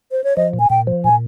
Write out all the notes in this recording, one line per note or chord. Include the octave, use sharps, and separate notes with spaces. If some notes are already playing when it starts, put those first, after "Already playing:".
C5
C#5
F3 D#5
A#2
G#5
A#2 G5
F3
A#2 G#5